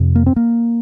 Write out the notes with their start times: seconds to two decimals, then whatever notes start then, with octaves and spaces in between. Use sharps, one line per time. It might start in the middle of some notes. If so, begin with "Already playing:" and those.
Already playing: F2 C3
0.15 A#3
0.26 C4
0.36 A#3